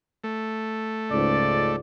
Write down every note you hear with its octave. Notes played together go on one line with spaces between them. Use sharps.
A3
C#2 G#2 D5